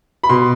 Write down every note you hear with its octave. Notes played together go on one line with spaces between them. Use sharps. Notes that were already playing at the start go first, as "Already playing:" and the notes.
B5
B2 C6